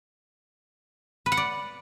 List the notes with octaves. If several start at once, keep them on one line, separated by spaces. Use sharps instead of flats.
B4
F#5
D5